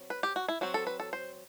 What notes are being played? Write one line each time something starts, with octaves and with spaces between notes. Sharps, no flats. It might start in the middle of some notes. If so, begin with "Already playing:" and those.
Already playing: F#3 C4
B4
G4
F#4
E4
F#3 C4 F#4
A4
B4
A4
C5